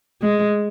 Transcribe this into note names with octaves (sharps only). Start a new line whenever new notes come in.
G#3